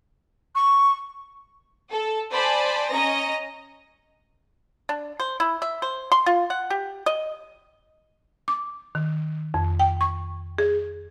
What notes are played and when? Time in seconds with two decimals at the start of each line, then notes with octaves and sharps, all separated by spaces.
0.55 C#6
1.90 A4
2.32 C5 D5 G#5 A5 B5
2.89 C#4 D#5 A#5 A#6
4.89 D4
5.20 C5
5.40 E4
5.62 E5
5.82 C5
6.12 C6
6.26 F4
6.50 F#5
6.70 G4
7.06 D#5
8.48 D6
8.95 D#3
9.54 F2
9.80 G5
10.01 C#6
10.58 G#4